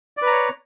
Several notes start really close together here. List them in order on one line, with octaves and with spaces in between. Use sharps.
D5 B4 A#5 C#5